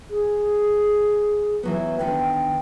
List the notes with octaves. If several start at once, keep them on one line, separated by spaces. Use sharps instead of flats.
G#4
E3 F#3 B3
D3 D#3 B3 G5